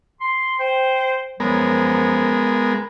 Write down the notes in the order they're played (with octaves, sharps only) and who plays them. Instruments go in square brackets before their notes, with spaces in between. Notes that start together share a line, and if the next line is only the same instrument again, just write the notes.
[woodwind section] C6
C5 G5
[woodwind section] F#2 F3 F#3 [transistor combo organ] G#3 B3 A#4